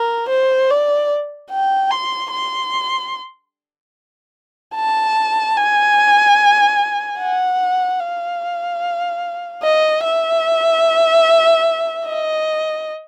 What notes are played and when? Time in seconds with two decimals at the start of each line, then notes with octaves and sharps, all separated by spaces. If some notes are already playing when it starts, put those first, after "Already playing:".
Already playing: A#4
0.29 C5
0.70 D5
1.51 G5
1.91 C6
2.32 C6
4.75 A5
5.57 G#5
7.19 F#5
8.00 F5
9.62 D#5
10.03 E5
12.06 D#5